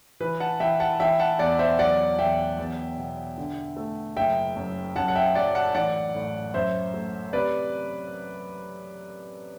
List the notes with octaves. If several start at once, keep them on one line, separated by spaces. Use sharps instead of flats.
E3 B4
F#5 A5
E3 E5 G5
F#5 A5
E3 E5 G5
F#5 A5
E2 D5 F#5
C5 E5
F#3 D5 F#5
E2 E5 G5
E2
B2
D3
A3
F#1 E5 G5
F#2
F#2 F#5 A5
F#5
E5 G5
F#3 D5 F#5
F#5 A5
A1 D5 F#5
A2
F#2 C5 E5
A3
C3 B4 D5